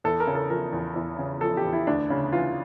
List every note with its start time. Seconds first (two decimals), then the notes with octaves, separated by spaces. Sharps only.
0.04 E2 A4
0.20 A#4
0.27 C#3
0.35 A4
0.50 F3 A#4
0.73 E2
0.96 E2
1.18 C#3
1.41 F3 A4
1.57 G4
1.65 E2
1.73 E4
1.87 D2 D4
2.10 C#3
2.32 E3 F4